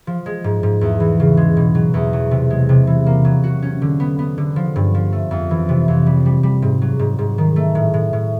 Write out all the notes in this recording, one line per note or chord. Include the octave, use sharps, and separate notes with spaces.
F3
G#3
G#2
G#2
E2
E3
C#3
G#3
B2
F#3
E2
F#3
C3
G#3
C3
E3
A#3
F#3
F#4
C#4
D3
B3
B3
D3
F3
G2
F3
A3
F2
E3
C3
F2
G3
G3
G3
G#2
F#3
G#2
G#2
D#3
A3
A2
A2
A2